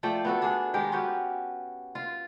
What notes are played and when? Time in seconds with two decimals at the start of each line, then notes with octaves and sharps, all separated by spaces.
0.03 F3 A3 D5 G5
0.25 B3 F#4 A4
0.42 D4 G#4
0.74 D#3 G#3 G4 A#4
0.92 B3 C#4 F#4 G4
1.95 F4